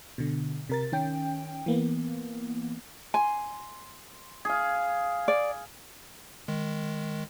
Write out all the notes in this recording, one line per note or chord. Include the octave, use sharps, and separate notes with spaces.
B2 D3
C3 A#4 A6
D#3 C#4 G5
E3 A#3 B3
G#5 C6
G#4 F5
D5
D#3 G#3